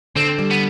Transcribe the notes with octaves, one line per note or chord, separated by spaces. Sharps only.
D3 C4
G3
B3